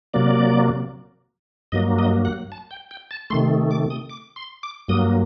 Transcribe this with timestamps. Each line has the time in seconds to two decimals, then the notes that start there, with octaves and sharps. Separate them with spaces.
0.14 C3 F#3 A#3 D5
1.72 G2 F#3 A#3 D#5
1.99 D#5
2.25 F#5
2.52 A5
2.71 G5
2.91 G5
3.11 A5
3.30 C3 D#3 A3 C6
3.71 D6
3.90 D#6
4.09 D6
4.36 C6
4.63 D6
4.88 G2 F#3 A#3 D#6